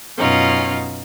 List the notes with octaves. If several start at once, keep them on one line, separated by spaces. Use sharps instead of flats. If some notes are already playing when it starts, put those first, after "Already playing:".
F#2 B2 C#4 D#4 F4